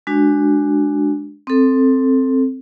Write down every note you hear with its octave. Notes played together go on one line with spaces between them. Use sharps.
G#3 D4 F#4
C4 A4